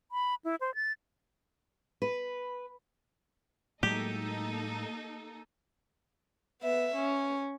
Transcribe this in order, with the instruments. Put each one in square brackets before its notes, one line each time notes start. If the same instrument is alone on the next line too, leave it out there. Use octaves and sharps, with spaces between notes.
[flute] B5
E4
C5
A6
[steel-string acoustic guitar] B4
[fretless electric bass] A2 F#3 G#3 [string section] A#3 D#4 A4 [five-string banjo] G4
[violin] B3 E5
C#4